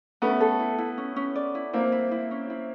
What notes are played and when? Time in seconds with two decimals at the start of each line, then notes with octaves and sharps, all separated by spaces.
0.22 A3 B3 C#4
0.41 A4
0.60 E4
0.79 E4
0.98 C#4
1.16 C#4
1.36 D5
1.55 E4
1.73 A#3 C4 E4
1.92 E4
2.11 E4
2.31 C#4
2.50 E4